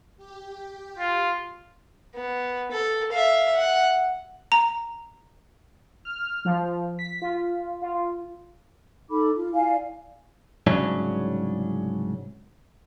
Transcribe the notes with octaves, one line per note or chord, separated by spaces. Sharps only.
G4
F4
B3
A4
E5 F5
F#5
A#5
F6
F3
B6
F4
F4
D#4 A4 B5 D6
F4
E4 D5 F5 G#5
C2 G#2 C#3 F#3 C#4 D4